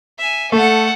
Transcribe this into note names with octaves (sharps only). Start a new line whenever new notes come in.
E5 G#5
A3 A4 F#5